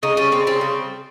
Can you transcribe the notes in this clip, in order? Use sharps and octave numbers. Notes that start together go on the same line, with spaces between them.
C#3 D#4
G3 C#4
C#3 C4
G3 C4
C#3